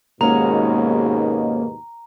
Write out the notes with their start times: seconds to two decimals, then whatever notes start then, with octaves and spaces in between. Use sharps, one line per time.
0.21 D#2 G#2 B2 G#3 A#3 C#4 F#4 A#5